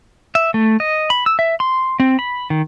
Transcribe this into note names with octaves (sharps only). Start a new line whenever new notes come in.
E5
A3
D#5
B5
E6
E5
C6
C4
B5
D#3